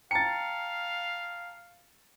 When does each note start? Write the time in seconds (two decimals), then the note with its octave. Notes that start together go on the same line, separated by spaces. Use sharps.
0.11 F5 G5 A5 A#5 A6 C#7